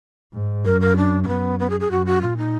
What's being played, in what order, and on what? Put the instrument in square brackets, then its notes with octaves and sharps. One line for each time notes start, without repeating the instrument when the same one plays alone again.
[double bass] G#2
[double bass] F#2 [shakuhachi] A#4
[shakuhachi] A#4
D4
D4
[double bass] F#2 [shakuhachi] B3
[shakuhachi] B3
G#4
G#4
[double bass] F#2 [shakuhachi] F#4
[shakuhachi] F#4
[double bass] A#2 [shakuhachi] F4
[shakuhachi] D#4